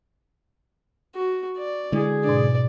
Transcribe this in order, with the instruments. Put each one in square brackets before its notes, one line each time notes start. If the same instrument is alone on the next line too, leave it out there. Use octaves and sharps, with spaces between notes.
[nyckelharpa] F#4
D5
[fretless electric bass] D3 G#3 [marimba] E4 [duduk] G#4
[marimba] G#2 B2 D4 [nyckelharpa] D5